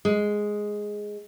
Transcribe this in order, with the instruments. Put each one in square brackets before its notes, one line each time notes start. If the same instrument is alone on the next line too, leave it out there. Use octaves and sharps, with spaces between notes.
[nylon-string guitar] G#3